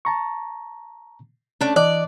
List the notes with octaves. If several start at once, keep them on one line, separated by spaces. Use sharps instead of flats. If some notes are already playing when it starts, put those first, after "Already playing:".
A5 A#5 C#6
A3 C#4 D4
E3 D5 D#5 F#6